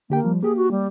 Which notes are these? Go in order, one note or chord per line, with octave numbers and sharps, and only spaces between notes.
D3 A#3 G4 G5
F3 G3
A#3 G4 G#4
F#4
G3